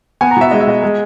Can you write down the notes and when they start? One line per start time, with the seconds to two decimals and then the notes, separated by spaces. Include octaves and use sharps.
0.21 B3 G#5
0.31 A#5
0.36 B2 E5
0.51 G#3 D#5
0.60 E5
0.67 B2 D#5
0.83 G#3